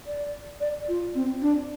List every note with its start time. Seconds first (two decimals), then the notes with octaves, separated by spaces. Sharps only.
0.07 D5
0.60 D5
0.88 F4
1.15 C4
1.42 D4